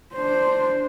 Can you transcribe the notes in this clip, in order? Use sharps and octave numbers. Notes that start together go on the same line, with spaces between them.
D4 C5